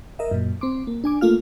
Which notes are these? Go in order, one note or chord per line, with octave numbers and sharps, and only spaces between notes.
A#4 D#5 E5
F#2 A#2
C4 C6 D6
A#3
D4 G#5 D6
A3 A#3 F4 F5 F6